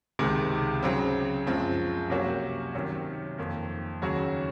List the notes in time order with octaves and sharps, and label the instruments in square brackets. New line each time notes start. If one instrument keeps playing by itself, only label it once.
[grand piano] C#2 C3 D#3 G#3
C#3 F#3 C4
F#2 F3 G#3 C4
C3 F#3 A#3 C#4 F#4
C3 D#3 F#3 C#4
F2 D#3 A#3
D#2 C#3 F#3 C#4 F#4